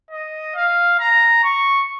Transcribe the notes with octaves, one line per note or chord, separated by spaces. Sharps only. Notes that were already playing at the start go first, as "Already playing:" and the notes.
D#5
F5
A#5
C#6